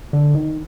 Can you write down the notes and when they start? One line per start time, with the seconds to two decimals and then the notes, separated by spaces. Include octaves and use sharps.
0.13 D3
0.35 D#3